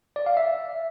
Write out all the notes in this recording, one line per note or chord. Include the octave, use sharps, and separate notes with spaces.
D5
F5
E5